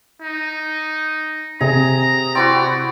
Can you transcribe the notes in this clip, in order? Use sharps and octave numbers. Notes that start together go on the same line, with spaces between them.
D#4
C3 G#4 A#5
C4 E4 F#4 D5